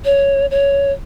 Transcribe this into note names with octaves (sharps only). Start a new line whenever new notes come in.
C#5
C#5